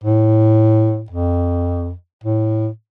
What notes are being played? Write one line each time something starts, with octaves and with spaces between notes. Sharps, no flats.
A2
F2
A2